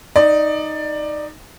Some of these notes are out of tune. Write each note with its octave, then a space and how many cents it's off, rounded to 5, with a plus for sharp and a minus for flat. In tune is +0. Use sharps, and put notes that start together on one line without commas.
D#4 +0 D5 +15